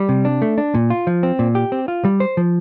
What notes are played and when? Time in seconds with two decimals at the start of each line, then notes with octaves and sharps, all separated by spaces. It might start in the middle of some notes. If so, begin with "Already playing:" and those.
Already playing: G3
0.09 C3
0.25 D4
0.42 A3
0.58 D4
0.75 A#2
0.90 F4
1.07 F3
1.23 C4
1.39 A#2
1.55 G4
1.72 C4
1.88 F4
2.05 G3
2.20 C5
2.37 F3